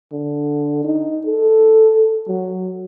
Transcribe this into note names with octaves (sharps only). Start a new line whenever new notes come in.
D3
D#4
A4
F#3